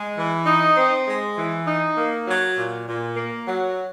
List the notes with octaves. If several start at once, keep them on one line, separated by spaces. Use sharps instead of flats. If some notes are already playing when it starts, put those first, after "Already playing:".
Already playing: G#3
E3
D#4
C4
G#3
E3
D#4
A#3
F#3
A#2
A#2
A#3
F#3